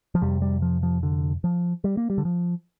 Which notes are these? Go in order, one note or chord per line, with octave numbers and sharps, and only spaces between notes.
F3
F2 C3 G3
G3
F3
F3
D3
F3
G3
A#3
G3
D3
F3